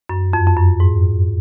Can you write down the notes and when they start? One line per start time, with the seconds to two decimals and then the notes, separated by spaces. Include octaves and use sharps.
0.09 F#2
0.33 F2
0.47 F2
0.57 F#2
0.80 G#2